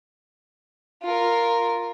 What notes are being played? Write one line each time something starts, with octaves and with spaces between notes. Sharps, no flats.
F4 A#4